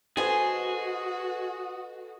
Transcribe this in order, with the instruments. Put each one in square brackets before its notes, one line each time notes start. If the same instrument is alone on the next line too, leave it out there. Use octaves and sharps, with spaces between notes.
[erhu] F#4 [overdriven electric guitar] G#4 [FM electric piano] A4 B4 D#5 [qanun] C5 G#5